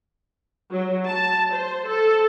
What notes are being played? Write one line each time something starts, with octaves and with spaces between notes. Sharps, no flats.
F#3
A5
C5
A4